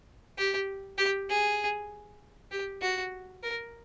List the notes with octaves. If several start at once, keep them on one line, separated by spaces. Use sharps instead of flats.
G4
G4
G#4
G4
F#4
A#4